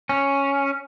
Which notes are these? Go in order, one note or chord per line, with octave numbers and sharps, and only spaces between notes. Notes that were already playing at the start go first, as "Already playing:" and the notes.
C#4